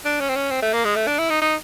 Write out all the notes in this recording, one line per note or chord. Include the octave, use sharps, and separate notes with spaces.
D4
C#4
C4
C#4
C4
A3
A#3
G#3
A3
D4
E4
D#4
D#4